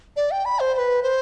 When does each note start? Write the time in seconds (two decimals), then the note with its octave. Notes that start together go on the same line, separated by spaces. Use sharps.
0.16 D5
0.31 G5
0.45 B5
0.60 C5
0.74 C5
0.78 B4
1.03 C5